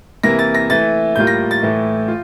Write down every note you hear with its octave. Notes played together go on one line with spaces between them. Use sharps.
C3 E3 A#3 E4 A#6
A6
A#6
E3 A3 E4 A6
A2 G3 A#3 F4 G6
A#6
A6
A2 E3 A3 E4
F4